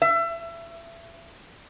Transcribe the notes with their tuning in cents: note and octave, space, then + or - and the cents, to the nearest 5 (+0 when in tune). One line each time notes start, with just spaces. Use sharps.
E5 +30